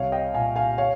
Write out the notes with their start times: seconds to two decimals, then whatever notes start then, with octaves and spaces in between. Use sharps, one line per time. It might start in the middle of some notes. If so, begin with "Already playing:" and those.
Already playing: C2 C#5 F5
0.12 D#5 G5
0.34 A#2 F5 G#5
0.56 F5 G#5
0.78 C#5 F5